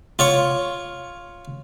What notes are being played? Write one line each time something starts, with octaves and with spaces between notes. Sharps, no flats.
F4 C#5 C#6